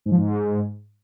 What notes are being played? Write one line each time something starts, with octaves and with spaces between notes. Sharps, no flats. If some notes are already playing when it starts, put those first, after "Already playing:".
G#2
F3
G#2